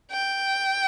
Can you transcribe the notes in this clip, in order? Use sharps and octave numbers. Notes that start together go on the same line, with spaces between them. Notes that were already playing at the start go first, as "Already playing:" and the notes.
G5